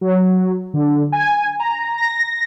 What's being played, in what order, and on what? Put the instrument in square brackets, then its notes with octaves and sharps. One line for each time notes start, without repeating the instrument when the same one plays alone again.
[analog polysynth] F#3
D3
G#5
A#5
A#6